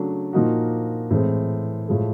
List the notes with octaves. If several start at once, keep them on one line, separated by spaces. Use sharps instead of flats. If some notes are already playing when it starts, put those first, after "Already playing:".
Already playing: C#3 F#3 A3 D4
A#2 F3 A#3 D#4 F#4
A2 E3 G#3 C4
A2 F3 G#3